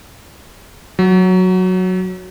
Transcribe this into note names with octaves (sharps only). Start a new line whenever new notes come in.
F#3